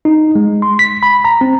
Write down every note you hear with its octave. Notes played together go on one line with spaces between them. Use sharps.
D#4
G#3
C6
B6
B5
A#5
C4